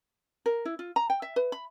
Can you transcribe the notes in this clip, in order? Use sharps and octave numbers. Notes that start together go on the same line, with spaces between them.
A#4
E4
F4
A#5
G5
E5
B4
B5